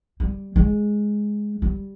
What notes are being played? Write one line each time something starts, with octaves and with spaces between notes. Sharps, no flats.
G3
G#3
G3